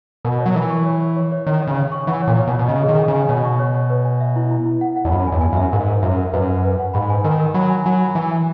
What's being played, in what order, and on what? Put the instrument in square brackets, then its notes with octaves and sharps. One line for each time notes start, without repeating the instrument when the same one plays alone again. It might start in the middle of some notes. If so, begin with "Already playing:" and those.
[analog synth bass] B2 [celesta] A#4
[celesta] C#5
[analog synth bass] F#3
[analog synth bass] E3 [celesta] A#4
[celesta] C#6
C#5
C#5
C#5
C#5
[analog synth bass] D#3 [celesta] C#5
[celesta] C#5
[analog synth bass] C#3
[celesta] C#5
C#6
[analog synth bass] E3 [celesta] F#5
[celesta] C#5
[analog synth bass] A#2
[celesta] C#5
[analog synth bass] B2
[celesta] C#5
[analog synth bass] B2
[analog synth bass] C#3 [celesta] D#5
[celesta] G#4
[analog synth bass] D#3
[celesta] G#5
[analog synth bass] C#3
[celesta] G#5
[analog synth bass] B2 [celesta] C#5
[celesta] C#6
C#5
C#5
B4
G#5
E5
E4
E4
E4
F#5
F#5
[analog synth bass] E2
[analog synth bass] F#2 [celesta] B5
[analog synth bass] E2 [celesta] G#5
[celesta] G#5
[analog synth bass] F#2 [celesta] E5
[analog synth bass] G#2 [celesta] A#4
[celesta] A#4
[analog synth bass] F#2 [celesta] E5
[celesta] A#4
[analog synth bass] F#2 [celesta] B4
[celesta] B4
B4
F#5
[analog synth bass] G#2 [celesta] B5
[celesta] G#5
[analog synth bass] D#3 [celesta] A#4
[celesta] A#4
[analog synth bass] F#3 [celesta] B5
[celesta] G#5
[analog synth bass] F#3 [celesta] G#5
[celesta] B5
[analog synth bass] E3 [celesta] G#5
[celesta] E5